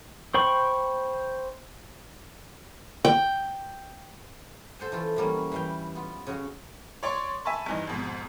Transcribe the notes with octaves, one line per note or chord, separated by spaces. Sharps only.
C5 G5 B5 C#6
G5
A4 C5 F#5 G#5
E3 A3 F4 A4
E3 F#3 G3 A#3 C#4
E3 G3 B4 F5 G5
B3 F4
C#3 C#4 F#4 C#5 F#5
C#5 D5 C6 C#6
E5 G#5 A5 B5 C#6
G2 E3 D#4
F2 G#2 B2